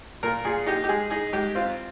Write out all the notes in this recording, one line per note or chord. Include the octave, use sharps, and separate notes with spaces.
A#2 A#4
A#2 G#4
D#4 G4
G4
G#3 G#4
D#4 G#4
G#2 G4
C4 F4